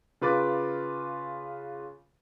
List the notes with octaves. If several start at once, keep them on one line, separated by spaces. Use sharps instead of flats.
C#3 F4 B4 D6 A6